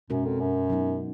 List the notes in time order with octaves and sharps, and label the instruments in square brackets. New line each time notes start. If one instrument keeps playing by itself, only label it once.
[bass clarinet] F#2 [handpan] B2 G#3 C#4 F#4 A#4
[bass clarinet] F2
F#2
[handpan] F#3 B3 D#4